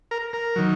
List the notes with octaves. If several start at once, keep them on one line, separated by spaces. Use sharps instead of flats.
A#4
A#4
D#3 F#3